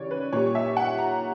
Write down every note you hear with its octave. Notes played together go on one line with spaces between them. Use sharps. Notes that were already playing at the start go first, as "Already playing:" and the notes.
Already playing: C#3 E3 G3 C#5 D5
B4
A#2 G3 C#5
E5
F#5
A#5